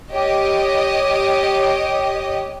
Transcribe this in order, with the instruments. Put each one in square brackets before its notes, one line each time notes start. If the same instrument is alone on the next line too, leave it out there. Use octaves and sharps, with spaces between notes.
[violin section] G4 C#5 D#5